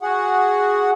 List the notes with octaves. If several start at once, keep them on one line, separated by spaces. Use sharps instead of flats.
F#4 G#4 F#5